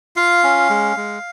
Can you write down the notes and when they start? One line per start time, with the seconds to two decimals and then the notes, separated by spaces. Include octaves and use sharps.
0.16 F4 F5
0.44 C#4
0.70 G#3
0.97 G#3